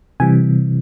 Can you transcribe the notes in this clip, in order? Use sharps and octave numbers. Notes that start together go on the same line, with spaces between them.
C3 E3 G3 G#5